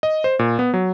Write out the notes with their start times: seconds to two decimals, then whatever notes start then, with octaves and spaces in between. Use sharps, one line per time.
0.03 D#5
0.24 C5
0.39 A#2
0.59 B3
0.74 F#3